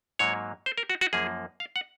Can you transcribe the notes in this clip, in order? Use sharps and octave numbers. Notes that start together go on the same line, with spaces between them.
G#2 F#3 A#3 C#5
C5
A#4
F#4
F#4
F#2 F3 A#3 G#4
F5
F#5